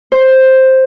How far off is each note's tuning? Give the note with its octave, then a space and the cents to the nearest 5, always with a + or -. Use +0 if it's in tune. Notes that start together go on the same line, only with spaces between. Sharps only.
C5 +5